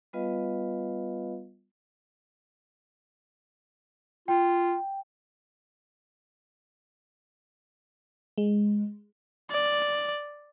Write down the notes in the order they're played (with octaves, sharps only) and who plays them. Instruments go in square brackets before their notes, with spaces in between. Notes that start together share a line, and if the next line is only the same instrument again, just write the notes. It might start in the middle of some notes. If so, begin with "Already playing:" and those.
[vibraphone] G3 B3 F4 B4 D#5 F5
[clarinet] F4 [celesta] G5
[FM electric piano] G#3
[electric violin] D5